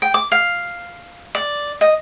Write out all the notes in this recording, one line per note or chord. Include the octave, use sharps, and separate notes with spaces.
G5
D6
F5
D5
D#5